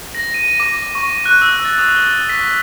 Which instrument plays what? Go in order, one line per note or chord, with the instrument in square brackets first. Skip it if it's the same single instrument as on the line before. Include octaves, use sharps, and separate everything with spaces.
[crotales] A#6
D#7
D6
C#6
F#6
E6
A6
D#6
G7
B6